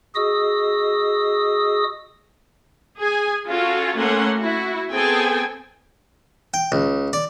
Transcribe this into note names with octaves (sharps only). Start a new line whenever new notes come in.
F#4 G#4 D#5 D#6 E6
G#4 G#5
C#4 F4 F#4 A4
A3 A#3 C#4 F#5 C6
E4 F#4
B3 C4 G#4 A4 G5 G#5
G5
C#2
D5